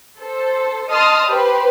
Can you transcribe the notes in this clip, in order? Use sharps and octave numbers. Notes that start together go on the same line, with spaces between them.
A4 C5
D#5 A5 C6 D#6 F6
G4 B4 C5